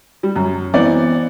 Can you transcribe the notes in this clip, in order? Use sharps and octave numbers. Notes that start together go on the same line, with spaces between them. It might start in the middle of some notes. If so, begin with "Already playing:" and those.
G3
F#2
E3 B3 C4 D5